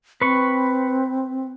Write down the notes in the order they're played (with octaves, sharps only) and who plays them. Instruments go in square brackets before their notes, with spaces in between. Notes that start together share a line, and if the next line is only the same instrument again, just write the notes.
[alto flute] C4 [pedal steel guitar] B4 C#6